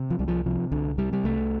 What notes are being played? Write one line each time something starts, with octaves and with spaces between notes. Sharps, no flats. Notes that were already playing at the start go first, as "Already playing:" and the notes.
Already playing: C3
F3
C2 G3
F3
C3 F3
C2 D3
C3 G3
G3
C2 A3